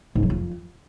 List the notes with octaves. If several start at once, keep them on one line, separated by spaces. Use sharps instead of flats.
G#2
F#3
F2